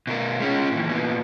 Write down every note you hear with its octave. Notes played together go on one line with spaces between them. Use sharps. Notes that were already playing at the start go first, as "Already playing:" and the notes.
B2 A#4
G#3 C#4
A#2 E3
A#2 B3